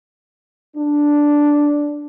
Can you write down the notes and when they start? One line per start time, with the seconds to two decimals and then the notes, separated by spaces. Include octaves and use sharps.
0.76 D4